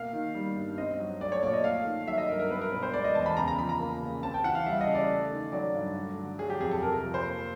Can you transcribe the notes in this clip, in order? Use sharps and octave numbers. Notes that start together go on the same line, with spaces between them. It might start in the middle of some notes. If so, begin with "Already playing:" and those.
Already playing: B2 A#3 F5
D#3
G3
G2
C4 D#5
F#3
A3 D5
C#5
A#2 D5
D#5
A3 F5
D#3
F#3 E5
D#5
G2 A#4
A#4
B3 B4
A#4
B2 B4
C5
G#3 D5
D#5
E2 A5
B5
C#3 A#5
A#5
F3 B5
A#5
A#3
C#3
C4 A5
G5
E3 F#5
F5
G3 E5
D#5
C#3
D5
A3
D#3
F#3 D5
G2
A3
D3
F#3 G#4
G4
F2 G#4
A4
C3 A#4
A#4
F3
C5
A#3